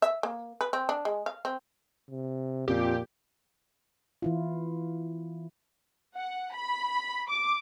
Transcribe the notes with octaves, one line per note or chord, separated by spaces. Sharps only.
E5
A#3
B4
C4
D4
G#3
F5
C4
C3
F2 A#2 F3 G4
E3 E4 F4
F#5
B5
D6